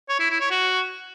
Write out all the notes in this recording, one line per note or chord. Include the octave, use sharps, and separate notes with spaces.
C#5
E4
E4
C#5
F#4